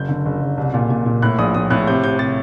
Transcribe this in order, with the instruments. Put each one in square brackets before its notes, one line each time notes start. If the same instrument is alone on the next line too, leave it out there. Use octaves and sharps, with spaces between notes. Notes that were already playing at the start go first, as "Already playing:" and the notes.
Already playing: [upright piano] F#1 G6
D3
F#1
F#1
C2
A#2
A#2
A#2
A2 F#6
A#1 D#6
A2 D#6
A2 F#6
C3 G6
C3 G6
C3 A6